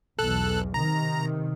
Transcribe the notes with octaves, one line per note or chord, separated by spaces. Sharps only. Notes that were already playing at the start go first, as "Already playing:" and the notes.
B1 E2 A4 F#6
C3 D#3 A#5